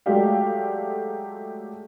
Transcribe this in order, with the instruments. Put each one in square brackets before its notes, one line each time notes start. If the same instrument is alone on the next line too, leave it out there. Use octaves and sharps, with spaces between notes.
[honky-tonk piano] F#3 G#3 A3 G4 D5 F5